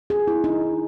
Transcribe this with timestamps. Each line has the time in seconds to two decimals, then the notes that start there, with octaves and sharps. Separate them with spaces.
0.10 G#4
0.28 E4
0.44 D#4